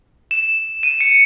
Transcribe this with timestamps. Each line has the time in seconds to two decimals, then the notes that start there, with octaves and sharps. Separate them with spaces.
0.31 E7
0.83 D#7
1.01 C#7